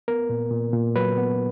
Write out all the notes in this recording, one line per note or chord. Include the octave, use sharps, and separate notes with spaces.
B3 A#4
A#2
A#2
A#2
F#3 B4
B3